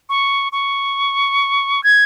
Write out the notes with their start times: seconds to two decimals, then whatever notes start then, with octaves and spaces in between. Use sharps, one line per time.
0.09 C#6
0.52 C#6
1.84 G#6